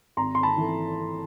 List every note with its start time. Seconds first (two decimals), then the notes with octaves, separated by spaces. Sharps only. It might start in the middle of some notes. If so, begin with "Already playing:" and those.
0.17 G#1 A#5 C6
0.35 C6
0.43 A5 B5
0.57 E3 A3